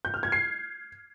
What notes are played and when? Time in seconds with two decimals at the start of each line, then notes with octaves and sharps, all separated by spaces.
0.05 G6
0.14 F6
0.23 G#6
0.32 C7